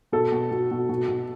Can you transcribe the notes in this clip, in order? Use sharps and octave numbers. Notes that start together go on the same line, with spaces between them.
B2 A4
B2
B2
B2
B2
B2